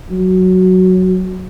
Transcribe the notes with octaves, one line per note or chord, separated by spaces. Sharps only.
F#3